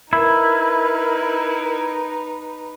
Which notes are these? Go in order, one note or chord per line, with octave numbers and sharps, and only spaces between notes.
D#4 E4 A#4 B4